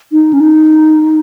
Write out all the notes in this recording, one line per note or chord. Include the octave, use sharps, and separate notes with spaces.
D#4
C#4
D#4